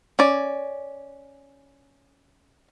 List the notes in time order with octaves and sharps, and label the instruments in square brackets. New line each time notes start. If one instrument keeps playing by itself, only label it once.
[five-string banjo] C#4 D5